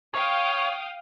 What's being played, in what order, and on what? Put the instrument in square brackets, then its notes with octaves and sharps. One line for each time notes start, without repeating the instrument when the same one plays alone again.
[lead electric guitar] C#5 [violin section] F5 G5 D#6